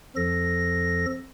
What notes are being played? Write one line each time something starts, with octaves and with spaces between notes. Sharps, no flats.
F2 F3 A4 A#6